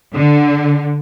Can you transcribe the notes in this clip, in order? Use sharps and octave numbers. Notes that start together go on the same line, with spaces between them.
D3